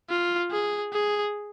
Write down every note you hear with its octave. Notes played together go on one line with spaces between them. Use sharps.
F4
G#4
G#4